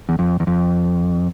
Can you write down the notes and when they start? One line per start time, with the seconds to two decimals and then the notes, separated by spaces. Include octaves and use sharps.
0.09 E2
0.19 F2
0.40 E2
0.47 F2